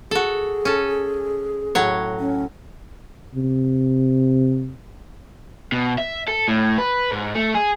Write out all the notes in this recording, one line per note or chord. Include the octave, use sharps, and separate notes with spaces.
F#4 G#4 A4
C#4 A4
A2 F#3 C#5
C#4
C3
B2
E5
A4
A2
B4
G#2
A3
G#4